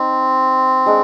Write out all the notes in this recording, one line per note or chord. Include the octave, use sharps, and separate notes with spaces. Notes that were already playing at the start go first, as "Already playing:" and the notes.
Already playing: C4 D#4
G#3 D4